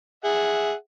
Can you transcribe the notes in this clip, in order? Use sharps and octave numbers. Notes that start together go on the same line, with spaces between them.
G#4 E5 F#5